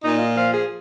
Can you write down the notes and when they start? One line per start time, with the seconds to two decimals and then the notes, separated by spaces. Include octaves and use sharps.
0.03 A#2 D#4
0.19 F4
0.35 F3 F5
0.51 G#4